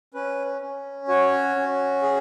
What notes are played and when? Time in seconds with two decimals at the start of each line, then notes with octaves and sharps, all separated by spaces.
0.14 C#4 B4
0.61 C#4
1.08 F#4 C#5
1.56 C#4
2.02 G#4